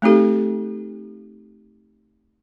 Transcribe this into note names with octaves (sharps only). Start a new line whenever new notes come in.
A3 C4 D#4 G4 A4